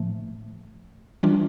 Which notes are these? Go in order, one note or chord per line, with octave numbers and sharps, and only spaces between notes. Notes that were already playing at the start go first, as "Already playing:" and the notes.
Already playing: A2 F3 A3
E3 G3 D4 F4